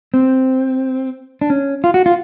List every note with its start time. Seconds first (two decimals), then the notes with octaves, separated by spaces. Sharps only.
0.14 C4
1.41 D4
1.50 C#4
1.84 F4
1.94 F#4
2.06 F4